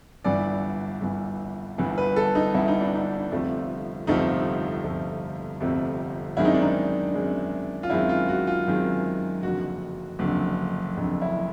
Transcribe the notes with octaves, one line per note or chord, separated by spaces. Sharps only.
G1 G2 E3 D5
G1 G2 E3
G1 G2 E3
B4
A4
D#4
G1 G2 E3 E4
D#4
D4
D#4
G1 F2 C3 F3 A3
G1 F2 C3 F3 A3 D#4
G1 F2 C3 F3 A3
G1 F2 C3 F3 A3
F#2 D#3 G#3 C4 E4
D#4
D4
D#4
F#2 D#3 G#3 C4
F4
F#2 D#3 G#3 C4 E4
F4
F#4
F4
F#2 D#3 G#3 C4
F#1 F2 D3 F#4
F#1 F2 D3
F#1 F2 D3
E4